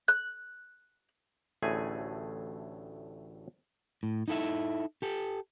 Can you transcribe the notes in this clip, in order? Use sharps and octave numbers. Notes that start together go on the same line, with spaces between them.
F#6
A1 D2 A2 A3 G#4 G#5
A2
D#4 E4 A4 D#5 E5
G4 A4